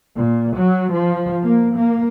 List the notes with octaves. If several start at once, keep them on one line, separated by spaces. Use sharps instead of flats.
A#2
F#3
F3
A#3
A#3